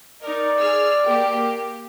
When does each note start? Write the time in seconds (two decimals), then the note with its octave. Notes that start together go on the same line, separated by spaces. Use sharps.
0.23 D#4 A#4 D5
0.58 G#4 E6 F6
1.05 A#3 G4